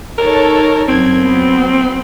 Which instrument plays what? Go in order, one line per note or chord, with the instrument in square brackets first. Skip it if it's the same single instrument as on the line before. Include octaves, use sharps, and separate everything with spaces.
[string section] D#4 A4 C#5 [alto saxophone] A#4
[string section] F#2 G#6 [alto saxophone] C4
[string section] F#3 B3